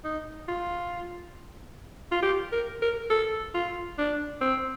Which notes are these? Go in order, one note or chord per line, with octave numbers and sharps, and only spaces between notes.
D#4
F4
F4
G4
A#4
A#4
A4
F4
D4
C4